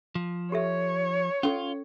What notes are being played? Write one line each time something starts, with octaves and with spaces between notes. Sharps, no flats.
F3
G4 A4 C#5 E5
C#4 F4 A4